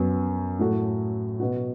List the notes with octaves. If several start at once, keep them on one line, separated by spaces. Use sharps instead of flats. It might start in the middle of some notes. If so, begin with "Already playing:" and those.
Already playing: F#2 F#3 B3
A2 A3 F#4
B2 B3 F#4